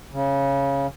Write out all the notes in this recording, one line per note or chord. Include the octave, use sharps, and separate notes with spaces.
C#3